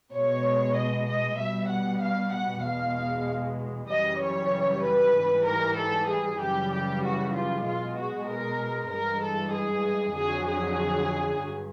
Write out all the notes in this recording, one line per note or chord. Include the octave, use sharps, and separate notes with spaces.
B2 C#5
G#3
D#5
D#5
B2 G3 E5
F#5
F5
F#5
E2 B2 G#3 F5
F#2 C#3 E3 G3 D#5
C#5
B4
G#2 E3 G3
A#4
A4
G#4
F#2 C#3 E3 G3 G4
G4
F#4
F4
B2 G#3 F4
F#4
A#4
G2 E3 G#3 A#4
A4
G#4
F2 D3 F#3 G#4
G#4
G2